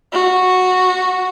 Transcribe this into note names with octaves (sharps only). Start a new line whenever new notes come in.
F#4